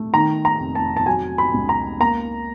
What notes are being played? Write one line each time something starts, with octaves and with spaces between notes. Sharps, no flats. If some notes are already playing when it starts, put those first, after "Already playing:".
Already playing: A3
D#3 A#5
A#5
F1
A5
A5
F#3 G#5
B5
C#2
A#5
A#3 A#5